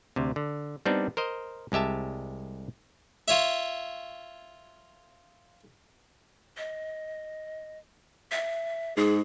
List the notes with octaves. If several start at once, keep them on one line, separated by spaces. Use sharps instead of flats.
D2 C3
D3
G3 B3 C4 D4 D#4
A#4 C5 D#5
C2 G#3 G4 E5 A5
F4 C#5 E5
D#5
E5
G#2 G#4